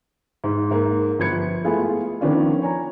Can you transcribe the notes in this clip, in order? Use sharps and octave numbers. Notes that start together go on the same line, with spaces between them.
G#2
G#2 A#3
G1 F3 B4 G#6 C#7
G#3 A3 B3 E4 F4 G#4
D#3 F3 B3 C#4 D4 F4
C#5 G#5 A#5